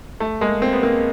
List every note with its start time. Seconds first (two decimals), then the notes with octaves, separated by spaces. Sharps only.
0.20 A3
0.41 G#3 A#3
0.62 A#3 C4
0.73 B3
0.83 A#3 C4